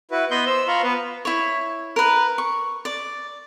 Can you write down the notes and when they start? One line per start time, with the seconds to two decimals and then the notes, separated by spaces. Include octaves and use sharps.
0.11 E4 F#4 B4
0.31 B3 D#5 B5 C6 G6
0.47 C5 E6
0.68 F4 F5 A#5 B5 C#6
0.83 B3 B4
1.25 E4 C#5
1.96 A#4 B4
2.38 C#6
2.85 D5